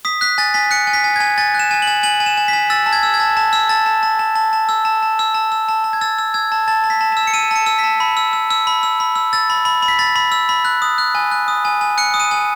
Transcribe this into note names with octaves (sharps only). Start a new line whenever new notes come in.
D#6 B6
F#6 B6
G#5 A6
G#5 B6
F#6 C#7
G#5
B6
G#5
G#5 G#6
G#5 A6
F#6
E7
G#5
F#7
G#5
G#5 F#7
G#5
E7
G#5
G#5 B6
E6 A6
A5
G#6
E6
G#6
A5
A5
E6
A5 A6
A5
A5
A5
A5
A5
E6
A5
A5
E6
A5
E6
A5
A5
G#6
E6 A6
E6
E6 G#6
A5
A5 A6
A5
B6
A5
E6 E7
C#7
E6 D#7
A5 C#7
E6
B6
A5
B5
E6
E6
E6
B5
E6
B5
E6
E6 A6
B5
B5
B5
B6
B5 A6
B5
E6
B5
F#6
D#6
F#6
G#5
F#6
D#6
G#5
G#5
F#6 C#7
D#6
D#7
G#5